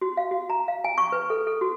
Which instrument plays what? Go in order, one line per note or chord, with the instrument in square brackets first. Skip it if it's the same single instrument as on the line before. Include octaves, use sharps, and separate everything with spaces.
[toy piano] F#4
F5
F#4
A#5
F5
G#5
C#6
B4
A4
A4
F#4